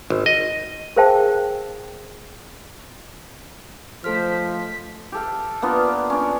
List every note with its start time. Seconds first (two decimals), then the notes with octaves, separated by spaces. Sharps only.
0.10 G#1
0.26 D#5
0.96 G#4 A#4 C5 F5 G5 A5
4.04 F3 A3 A4 C5 F6 B6
5.12 G4 A4 F5
5.62 A#3 B3 D4 F4
6.10 C#4 D4